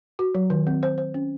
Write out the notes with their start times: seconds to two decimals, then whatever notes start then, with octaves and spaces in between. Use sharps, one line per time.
0.19 F#4
0.35 F#3
0.50 D#3
0.67 C4
0.83 C5
0.98 C5
1.14 C#4